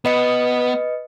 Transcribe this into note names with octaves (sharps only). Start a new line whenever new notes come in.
B3 B4 D#5 C#7